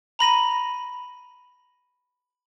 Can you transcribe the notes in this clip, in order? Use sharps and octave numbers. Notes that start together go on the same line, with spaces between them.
A#5 B5 A#6 D#7